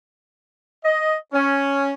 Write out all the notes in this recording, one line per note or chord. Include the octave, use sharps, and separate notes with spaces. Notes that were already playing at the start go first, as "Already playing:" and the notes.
D#5
C#4